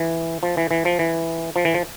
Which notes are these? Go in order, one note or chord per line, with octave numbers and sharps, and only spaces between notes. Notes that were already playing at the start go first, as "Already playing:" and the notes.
Already playing: E3
F3
E3
E3
F3
E3
F3
E3
F3